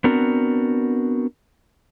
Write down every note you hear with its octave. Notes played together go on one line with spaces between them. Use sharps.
B3 C4 D4 F#4 A#4